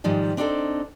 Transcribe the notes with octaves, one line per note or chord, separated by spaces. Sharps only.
G#2 D#3 F3 G3
C4 D4 D#4 G4 A4 C5